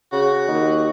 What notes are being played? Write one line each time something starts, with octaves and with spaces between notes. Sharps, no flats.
C#3 F#4
D#2 D#4